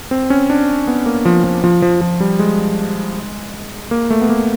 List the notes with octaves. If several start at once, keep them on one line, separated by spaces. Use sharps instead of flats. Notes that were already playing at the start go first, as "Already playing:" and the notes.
C4
C#4
D4
B3
A#3
F3
F3
F3
F3
F3
G3
G#3
A#3
A3
B3
A#3